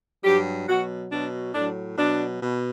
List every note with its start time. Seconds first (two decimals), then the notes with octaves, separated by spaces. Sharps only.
0.24 G2 F#3 G4
0.68 B2 F#3 F#4
1.10 B2 F#3 D4
1.54 A2 F#3 D4
1.98 B2 F#3 D4
2.41 B2